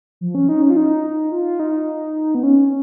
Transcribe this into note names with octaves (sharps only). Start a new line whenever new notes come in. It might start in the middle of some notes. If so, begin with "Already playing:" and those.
F3
C#4
D#4
C#4
F4
D#4
F4
D#4
B3
C#4